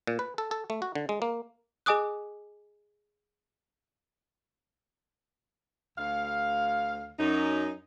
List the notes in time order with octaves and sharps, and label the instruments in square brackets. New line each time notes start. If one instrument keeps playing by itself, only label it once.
[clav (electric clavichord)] A#2
B4
A4
A4
A3
F#4
D3
G#3
A#3
[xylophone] G#4 D#5 G#5 D6 D#6 F#6
[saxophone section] D2 F5
F#2 D#4